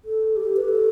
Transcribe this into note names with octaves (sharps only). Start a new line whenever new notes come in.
A4
G4
B4
A4